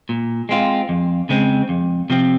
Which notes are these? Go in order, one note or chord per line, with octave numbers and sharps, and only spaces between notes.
A#2
G#3 C4 F4
F2
C#3 G#3 C4
F2
C3 F3 C4